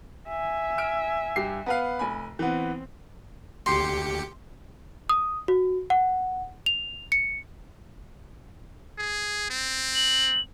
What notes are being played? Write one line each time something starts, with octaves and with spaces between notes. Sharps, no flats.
E5 G#5
E6 F6 D7
G2 G4 C7
B3 B4 F5
F1 G#5 B5
E3 B3 C4
D2 G4 C6 C#7
D#6
F#4
F#5
F7
C#7
G#4
C4
F#7